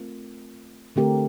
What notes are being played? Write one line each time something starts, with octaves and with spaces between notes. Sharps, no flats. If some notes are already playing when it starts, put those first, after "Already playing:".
Already playing: A3 C4 F4 A#4
D3 A3 C4 G4 A#4